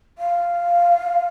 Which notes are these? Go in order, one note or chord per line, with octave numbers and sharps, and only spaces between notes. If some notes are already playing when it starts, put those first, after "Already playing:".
F5